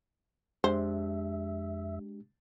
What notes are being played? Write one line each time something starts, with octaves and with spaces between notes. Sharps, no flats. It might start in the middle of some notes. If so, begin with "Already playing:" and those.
F2 G#3 D4 G4 C5 E5